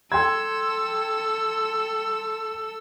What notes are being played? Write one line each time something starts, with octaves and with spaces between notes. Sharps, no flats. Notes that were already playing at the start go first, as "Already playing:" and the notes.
A4 G5 C6 E6 G#6